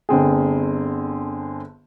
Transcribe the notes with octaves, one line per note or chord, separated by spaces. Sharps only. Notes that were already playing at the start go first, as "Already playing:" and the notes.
G1 D3 C4 G#4